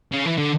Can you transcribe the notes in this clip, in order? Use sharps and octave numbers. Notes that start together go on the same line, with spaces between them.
C#3
E3
D3